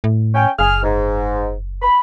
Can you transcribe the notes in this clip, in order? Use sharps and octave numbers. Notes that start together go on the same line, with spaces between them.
A2
C#4 G5
F#1 G#4 F6
G#2
B5